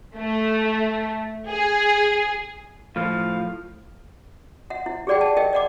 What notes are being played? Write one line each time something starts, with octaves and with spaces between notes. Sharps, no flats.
A3
G#4
A2 F3 F5
E5 F#5
E4
G4 G#4 D5 F#5 G5
A5
A#4 D#5 E5 G5
D5 F#5 D6